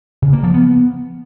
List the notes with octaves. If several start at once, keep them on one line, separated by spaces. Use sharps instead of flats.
C#3
A#3
F3
B3